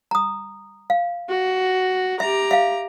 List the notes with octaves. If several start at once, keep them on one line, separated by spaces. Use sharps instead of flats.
A#5 D#6
F5
F#4
G4 E5 A#5
E5 F5